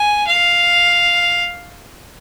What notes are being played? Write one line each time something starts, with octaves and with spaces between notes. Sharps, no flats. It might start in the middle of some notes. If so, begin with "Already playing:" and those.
Already playing: G#5
F5